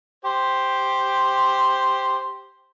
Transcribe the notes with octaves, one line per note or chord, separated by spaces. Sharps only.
G4 C5